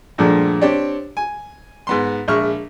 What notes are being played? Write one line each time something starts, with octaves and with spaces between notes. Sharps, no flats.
G2 A#2 D3 F3 G#3 A3
C4 D4 G4 C#5 D5
G#5
G#2 B3 C6
A#1 G#3 E5 C#6 F6